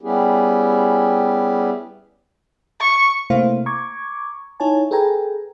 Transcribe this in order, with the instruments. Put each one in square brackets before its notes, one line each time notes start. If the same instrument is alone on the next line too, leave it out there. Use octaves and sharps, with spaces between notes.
[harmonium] G3 B3 C#4 E4 G4 G#4
[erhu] C#6
[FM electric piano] C3 A3 A#3 E4 C5 F5
A#5 C#6 D6 G#6
D#4 E4 C#5 G#5 A5
G#4 A4 B4 G5 G#5 A#5